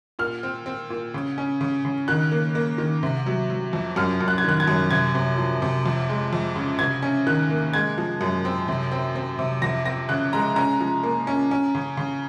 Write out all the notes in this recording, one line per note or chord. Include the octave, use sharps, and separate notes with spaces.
A#2 F6
C4
C4
A#2
C#3
C#4
C#3
C#3
D#3 F#6
A#3
A#3
D#3
C3
F#3
F#3
F2
F#2 F6
F#2
F#6
G#6
D#3 F#6
G#6
F#2
C3 G#6
C3
F3
C3
F2
G#3
F2
C#3
C3 G#6
C#4
D#3 F#6
A#3
G#3 G#6
F3
F#2
C4
C3
C4
C4
C3
F2 A#6
C4 A#6
C#3 F#6
G#3 A#5
C#4 A#5
F3
A#3
C#4
C#4
C#3
C#3